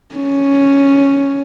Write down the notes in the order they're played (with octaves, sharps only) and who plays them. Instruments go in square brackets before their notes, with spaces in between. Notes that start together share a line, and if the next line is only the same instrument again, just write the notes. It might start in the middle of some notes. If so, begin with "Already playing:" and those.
[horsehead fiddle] C#4